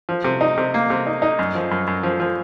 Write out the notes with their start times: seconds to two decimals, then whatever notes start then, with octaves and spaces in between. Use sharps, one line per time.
0.09 F3
0.24 C3
0.41 D#4
0.58 C3
0.74 A#3
0.90 C3
1.06 D#4
1.22 D#4
1.39 F#2
1.55 F3
1.71 F#2
1.87 F#2
2.03 F3
2.20 F3